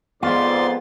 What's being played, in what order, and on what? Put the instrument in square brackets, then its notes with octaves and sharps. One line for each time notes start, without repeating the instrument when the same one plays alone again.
[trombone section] F2 G#2 [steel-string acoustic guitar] B3 [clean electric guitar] F4 [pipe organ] D5 C6 A6